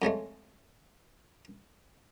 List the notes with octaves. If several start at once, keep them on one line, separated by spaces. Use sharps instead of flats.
F2 C#3 G#3 A3